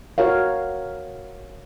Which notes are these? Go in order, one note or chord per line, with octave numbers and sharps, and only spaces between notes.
F#4 A#4 C#5 F5